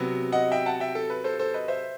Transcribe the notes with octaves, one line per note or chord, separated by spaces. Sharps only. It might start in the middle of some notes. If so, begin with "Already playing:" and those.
Already playing: C3 F#3 B3
D#5 F#5
E5 G5
F#5 A5
E5 G5
A4
B4
A4 C5
A4 C5
B4 D#5
C5 E5